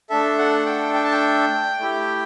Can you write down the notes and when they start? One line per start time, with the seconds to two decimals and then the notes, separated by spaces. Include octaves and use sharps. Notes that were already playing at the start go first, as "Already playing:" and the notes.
0.10 A3 D4 A4 E5
0.38 F#5
0.66 G5
0.94 G5
1.04 A5
1.12 G5
1.79 A3 E4 G4